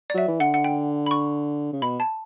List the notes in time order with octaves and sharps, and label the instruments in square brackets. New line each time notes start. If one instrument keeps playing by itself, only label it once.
[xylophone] D5
[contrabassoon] F#3 [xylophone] E5
[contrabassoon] E3
[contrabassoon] D3 [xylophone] F#5
[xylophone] F#5
G5
B5
C#6
[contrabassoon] C#3
[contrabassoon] B2 [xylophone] B5
[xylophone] A5